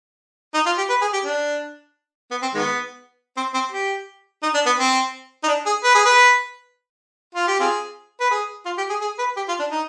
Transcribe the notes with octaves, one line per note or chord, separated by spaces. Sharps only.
D#4
F4
G4
B4
G#4
G4
D4
B3
C4
D#3 G#3 B3
C4
C4
G4
D#4
D4
B3
C4
D#4
D4
G#4
B4
G#4
B4
F4
G4
C4 F4 G#4
B4
G#4
F4
G4
G#4
G#4
B4
G4
F4
D4
D#4